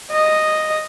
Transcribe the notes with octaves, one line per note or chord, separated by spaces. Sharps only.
D#5